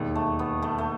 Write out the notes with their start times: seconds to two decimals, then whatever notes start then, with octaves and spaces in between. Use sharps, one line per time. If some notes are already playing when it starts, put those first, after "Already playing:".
Already playing: E1 D#2 D#3
0.15 A3
0.39 B3
0.62 A3
0.78 A3